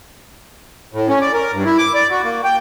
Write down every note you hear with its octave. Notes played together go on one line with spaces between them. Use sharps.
A2
C#4
D5
A#4
G2
E4
D6
D5
F#4
A#3
G5